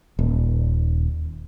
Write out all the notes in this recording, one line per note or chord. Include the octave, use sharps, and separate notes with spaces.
D#1